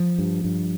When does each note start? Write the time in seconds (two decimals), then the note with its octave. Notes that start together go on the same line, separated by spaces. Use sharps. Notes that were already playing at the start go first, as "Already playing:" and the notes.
Already playing: F3
0.19 G2
0.45 G2